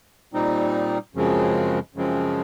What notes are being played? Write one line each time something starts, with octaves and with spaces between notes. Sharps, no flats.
A#2 G3 C4 D#4
F#2 C#3 F3 G#3 C4
F#2 C#3 F3 G#3 C4